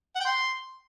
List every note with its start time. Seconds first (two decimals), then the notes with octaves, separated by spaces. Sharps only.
0.15 F#5
0.20 G5
0.25 C6